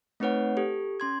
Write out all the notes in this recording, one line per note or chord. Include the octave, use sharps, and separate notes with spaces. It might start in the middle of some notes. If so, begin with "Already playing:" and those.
A3 C4 D#4 B4 C#5 F#5
G4 A4
C#4 C6 G#6